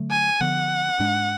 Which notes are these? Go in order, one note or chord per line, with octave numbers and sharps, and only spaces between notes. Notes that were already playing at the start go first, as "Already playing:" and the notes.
Already playing: D3 F#3 A3
G#5
D3 F3 B3 F#5
G#2 G#3 D4